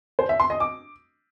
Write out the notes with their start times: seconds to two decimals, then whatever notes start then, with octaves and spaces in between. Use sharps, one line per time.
0.19 C5
0.29 E5
0.40 C6
0.50 D#5
0.60 D6